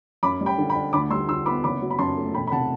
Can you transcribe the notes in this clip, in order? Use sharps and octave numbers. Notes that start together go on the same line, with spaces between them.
F#2 B5 D6
G3
G5 B5
D3
G5 B5
D4
D2 B5 D6
G3 C6 E6
D3 C6 E6
B3 B5 D6
F#1 B5 D6
F#3
B5
F#2 A5 C6
A3
E1 G5 B5
B5
C3 F#5 A5